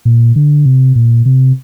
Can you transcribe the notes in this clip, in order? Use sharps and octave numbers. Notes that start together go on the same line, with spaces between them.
A#2
D3
C3
A#2
C3